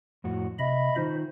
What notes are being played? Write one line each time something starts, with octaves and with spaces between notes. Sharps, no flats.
F2 A2 F#4
C3 D#5 E5 B5
D#3 D#4 F4 C5